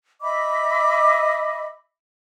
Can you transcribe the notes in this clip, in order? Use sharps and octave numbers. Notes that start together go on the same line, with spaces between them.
D#5 E5 B5 D6